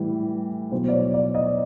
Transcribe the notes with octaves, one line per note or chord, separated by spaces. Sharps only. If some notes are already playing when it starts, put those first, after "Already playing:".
Already playing: A2 E3 G3
B2 F#3 C5
D5
C#5
D5
D#5